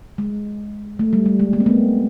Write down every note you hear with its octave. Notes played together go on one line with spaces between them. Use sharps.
G#3
A3
G3
G3
G#3
G#3 A#3
C4
A3 B3